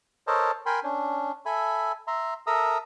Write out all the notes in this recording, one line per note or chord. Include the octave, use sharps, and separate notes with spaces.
A4 A#4 C5 C#5 D#5 A5
A#4 G5 G#5 B5 C6
C#4 D4
A4 E5 G#5 B5
E5 A#5 C6
A4 A#4 E5 A#5 D#6 E6